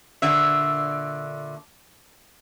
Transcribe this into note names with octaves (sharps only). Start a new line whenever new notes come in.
A#2 D3 E5